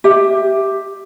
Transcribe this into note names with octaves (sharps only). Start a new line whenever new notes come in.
G4 E5